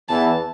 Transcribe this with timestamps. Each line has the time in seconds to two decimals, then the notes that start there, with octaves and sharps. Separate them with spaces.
0.09 E2 E3 A5